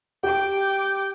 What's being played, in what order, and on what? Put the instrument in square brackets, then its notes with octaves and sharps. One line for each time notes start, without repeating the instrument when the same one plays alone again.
[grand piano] G4 [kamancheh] G5 D6